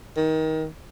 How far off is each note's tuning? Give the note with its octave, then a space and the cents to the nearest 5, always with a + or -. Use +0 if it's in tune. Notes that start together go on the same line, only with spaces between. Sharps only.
D#3 +25